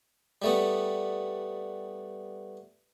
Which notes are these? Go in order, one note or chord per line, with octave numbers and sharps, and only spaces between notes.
G3 A3 B3